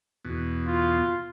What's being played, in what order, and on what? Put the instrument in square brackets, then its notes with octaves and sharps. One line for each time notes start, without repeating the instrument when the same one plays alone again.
[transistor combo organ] E2 B2
[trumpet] F4